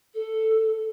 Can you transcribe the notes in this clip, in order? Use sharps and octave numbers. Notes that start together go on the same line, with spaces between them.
A4